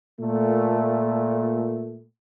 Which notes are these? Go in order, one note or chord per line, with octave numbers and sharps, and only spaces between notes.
A#2 A3